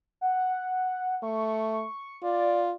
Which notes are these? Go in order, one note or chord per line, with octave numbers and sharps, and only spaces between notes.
F#5
A3 C#6
F4 D5